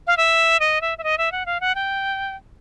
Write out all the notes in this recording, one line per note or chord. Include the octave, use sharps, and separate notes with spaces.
F5
E5
D#5
E5
E5
D#5
E5
F#5
F5
F#5
G5